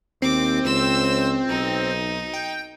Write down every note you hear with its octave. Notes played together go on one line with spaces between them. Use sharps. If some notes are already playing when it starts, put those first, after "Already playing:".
D#2 C4 D6
C#2 C5 E6
B1 D#4
G5